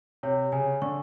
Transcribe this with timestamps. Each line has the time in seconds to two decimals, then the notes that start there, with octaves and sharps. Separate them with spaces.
0.23 C3 C#5
0.52 C#3 G#5
0.82 D3 C#6